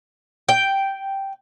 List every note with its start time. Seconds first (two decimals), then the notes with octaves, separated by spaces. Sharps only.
0.49 G5